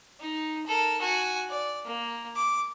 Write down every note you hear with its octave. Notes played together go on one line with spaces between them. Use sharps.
D#4
A4 A#4
F#4 G#5
D5
A#3
D6